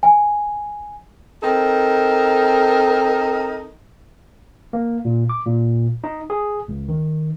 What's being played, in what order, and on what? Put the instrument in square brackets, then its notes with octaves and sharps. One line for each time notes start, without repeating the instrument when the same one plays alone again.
[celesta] G#5
[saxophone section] C4 D#4 A4 A#4
[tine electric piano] A#3
A#2
D6
A#2
D#4
G#4
C#2
D#3